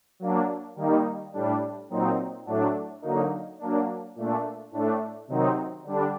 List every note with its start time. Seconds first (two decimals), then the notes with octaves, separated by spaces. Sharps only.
0.19 F#3 A#3 D4
0.76 D#3 G3 A#3 D#4
1.33 A2 G3 D4
1.90 A#2 F#3 C4 D#4
2.46 A2 F#3 A3 D4
3.02 D3 F#3 A#3 D#4
3.59 F#3 A#3 D4
4.15 A#2 A3 D4
4.71 A2 A3 D4
5.28 C3 D#3 F#3 C4 D#4
5.84 D3 G3 D4